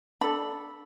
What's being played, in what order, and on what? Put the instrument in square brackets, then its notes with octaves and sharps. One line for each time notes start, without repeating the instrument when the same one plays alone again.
[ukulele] D4 A4 B5